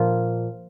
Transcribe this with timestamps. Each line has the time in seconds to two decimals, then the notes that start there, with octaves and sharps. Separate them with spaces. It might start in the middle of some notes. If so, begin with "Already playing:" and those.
Already playing: A#2 F3